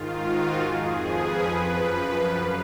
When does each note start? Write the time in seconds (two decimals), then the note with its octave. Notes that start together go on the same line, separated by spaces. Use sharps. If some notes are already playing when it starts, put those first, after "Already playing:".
Already playing: G#2 D#3 F4
0.18 F#4
0.60 F2 F3 G#4
1.04 B4
1.45 F3
1.50 F#2
2.31 F#2 C#3 F5